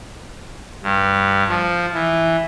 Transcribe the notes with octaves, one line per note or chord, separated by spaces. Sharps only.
G2
F3
E3